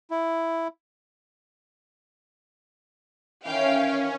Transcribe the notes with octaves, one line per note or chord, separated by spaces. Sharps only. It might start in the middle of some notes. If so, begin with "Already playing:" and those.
E4
D#3 E3 C#4 F5 G5